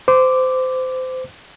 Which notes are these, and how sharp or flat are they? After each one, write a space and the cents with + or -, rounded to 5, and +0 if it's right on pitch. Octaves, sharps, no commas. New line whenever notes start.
C5 -25 D6 +0